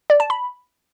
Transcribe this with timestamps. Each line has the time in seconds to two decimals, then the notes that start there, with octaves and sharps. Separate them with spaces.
0.10 D5
0.20 A5
0.30 B5